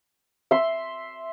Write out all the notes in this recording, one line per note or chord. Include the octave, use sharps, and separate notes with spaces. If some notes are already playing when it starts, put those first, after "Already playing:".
E5 C6